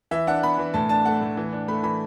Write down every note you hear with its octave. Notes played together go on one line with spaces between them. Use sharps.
E3 E5
D4 F#5
B3 B5
E3
A2 A5
D4 A5
A3 F#5
A2
E3
D4
A3 B5
E3 B5